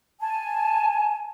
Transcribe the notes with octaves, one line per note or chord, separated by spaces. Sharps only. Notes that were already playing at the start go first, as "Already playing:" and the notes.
G#5 A5